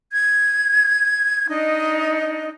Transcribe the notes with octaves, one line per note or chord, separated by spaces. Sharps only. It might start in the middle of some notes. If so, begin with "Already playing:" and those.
G#6
D4 D#4 D#5